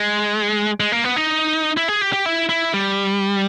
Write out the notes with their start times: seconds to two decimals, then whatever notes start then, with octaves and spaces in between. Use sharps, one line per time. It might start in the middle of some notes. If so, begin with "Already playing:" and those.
Already playing: G#3
0.80 G#3
0.92 A#3
1.04 B3
1.16 D#4
1.77 E4
1.88 G#4
2.01 G4
2.13 G4
2.26 E4
2.49 E4
2.74 G3